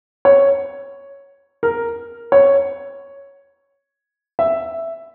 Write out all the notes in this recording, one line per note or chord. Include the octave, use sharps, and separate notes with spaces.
C#5
A#4
C#5
E5